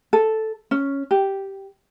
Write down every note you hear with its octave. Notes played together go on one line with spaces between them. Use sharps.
A4
C#4
G4